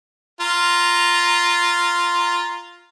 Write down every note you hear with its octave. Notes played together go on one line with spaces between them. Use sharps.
F4 A#5